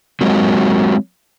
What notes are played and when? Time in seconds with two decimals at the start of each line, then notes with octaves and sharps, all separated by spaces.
0.21 F#3 G#3 A#3 C4